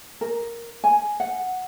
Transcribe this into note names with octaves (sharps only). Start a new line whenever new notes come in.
A#4
G#5
F#5